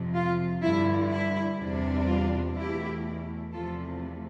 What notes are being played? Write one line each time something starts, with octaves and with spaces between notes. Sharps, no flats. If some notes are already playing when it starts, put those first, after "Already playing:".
Already playing: F2 C3 F3
F4
G2 D3 G3 E4
E4
E2 C3 G3 D4
F4
E2 B2 A3 E4 G4
E2 C3 F3 A3 F4 A4